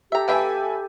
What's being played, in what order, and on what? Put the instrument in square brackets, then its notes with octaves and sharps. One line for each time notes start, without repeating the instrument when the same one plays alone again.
[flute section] G4 A4 [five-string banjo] E5 A#5
[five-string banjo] A#3 G5 [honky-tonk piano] B4 E5 G#5